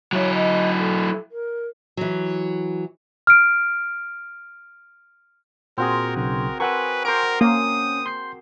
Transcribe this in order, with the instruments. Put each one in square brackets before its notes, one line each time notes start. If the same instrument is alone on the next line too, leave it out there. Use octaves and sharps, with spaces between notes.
[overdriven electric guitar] F#3 E4 [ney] C#5
[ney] D#5
A4
A#4
[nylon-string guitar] E3 F#3
[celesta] F6 D7
[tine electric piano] A#2 [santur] C4 F#4 G#4 [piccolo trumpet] A#4
[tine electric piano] B1 C#3 [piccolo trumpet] A#4
[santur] A#4 F#5 E6 [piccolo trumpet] B4 [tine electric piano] G#5 C#6
[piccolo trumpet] A#4 [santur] C5 D6 [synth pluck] D7
[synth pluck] A#3 [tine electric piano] C#4 [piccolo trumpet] D#6
[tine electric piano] C6 G6 C7